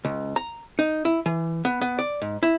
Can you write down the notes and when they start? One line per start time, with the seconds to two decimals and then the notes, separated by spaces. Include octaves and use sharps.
0.05 C#2
0.36 A#5
0.79 D#4
1.05 E4
1.26 E3
1.65 B3
1.81 B3
1.99 D5
2.22 G#2
2.43 E4